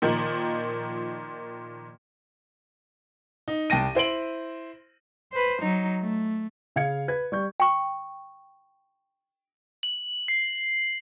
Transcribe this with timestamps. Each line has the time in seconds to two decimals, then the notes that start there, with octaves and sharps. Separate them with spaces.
0.02 A#2 D#3 F3
3.48 D#4
3.70 C2 G5 A5 A#6 D#7
3.95 E4 C5 D7 F#7
5.32 B4 C5
5.62 F#3 D#4
6.01 A3
6.76 C#3 F5 G#6 C#7
7.08 B4 G#6
7.32 G3 C#6 G6
7.60 G5 C#6
9.83 F#7
10.28 C7